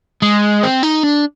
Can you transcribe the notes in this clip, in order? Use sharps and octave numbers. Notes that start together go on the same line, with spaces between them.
G#3
C4
D#4
D4